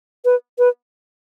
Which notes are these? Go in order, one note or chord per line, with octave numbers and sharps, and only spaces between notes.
B4
B4